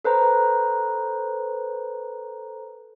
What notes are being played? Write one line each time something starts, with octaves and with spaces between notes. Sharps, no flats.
A4 B4 C5 A#5